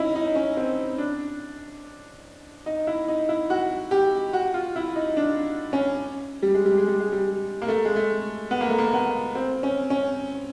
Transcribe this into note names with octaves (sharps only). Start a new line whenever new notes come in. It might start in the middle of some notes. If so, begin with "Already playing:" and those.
Already playing: C#4 D#4 E4
D#4
C#4
C4
D4
D#4
E4
D#4
E4
F#4
G4
F#4
F4
E4
D#4
D4
C#4
G3
G#3
G3
G#3
G3
G#3
G3
A#3
A3
G#3
A3
B3
A#3
A3
A#3
B3
C4
C#4
C#4